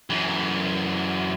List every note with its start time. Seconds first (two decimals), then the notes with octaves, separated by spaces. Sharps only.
0.10 F#2 E3